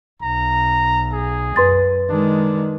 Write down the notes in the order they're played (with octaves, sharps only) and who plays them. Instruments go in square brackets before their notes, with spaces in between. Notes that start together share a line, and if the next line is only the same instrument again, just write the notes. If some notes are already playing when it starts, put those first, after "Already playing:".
[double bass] B1 [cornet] A#5
[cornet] G#4
[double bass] F#2 [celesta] B4 C6 A6
[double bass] D#3 G#3 [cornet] D4